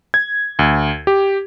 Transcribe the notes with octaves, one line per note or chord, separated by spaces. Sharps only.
G#6
D2
G4